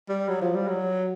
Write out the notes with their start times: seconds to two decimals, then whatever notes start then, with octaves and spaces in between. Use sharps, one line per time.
0.09 G3
0.28 F#3
0.41 F3
0.55 G3
0.68 F#3